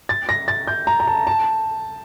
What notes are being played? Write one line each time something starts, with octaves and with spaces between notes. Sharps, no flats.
A6
A#6
A6
G6
A#5
A#5
A5
A5